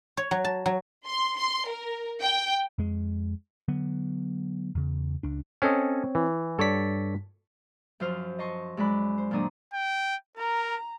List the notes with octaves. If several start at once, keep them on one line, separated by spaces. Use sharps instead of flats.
C#5
F#3
A5
F#3
C6
C6
A#4
G5
F2 G#3
D3 F#3 B3
E2 C#3
C#2 D4
C4 C#4 A4 C#5 D#5
E3
G2 A4 C#5 D5 B6
F#2 F3 F4 C5 F6
D#5 A5 C6 C#6
F#2 G#3 D5 B5
C5
A#2 D#3 F#3 D4 A#4 D#6
G5
A#4 A#5